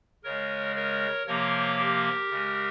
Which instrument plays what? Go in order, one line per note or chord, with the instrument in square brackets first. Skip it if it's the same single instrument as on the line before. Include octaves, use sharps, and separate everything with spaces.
[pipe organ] C#3 G#3 A#4 C#5
A#4 C#5
C3 F3 A#3 A#4 C#5
G4 A#4
C#3 G#3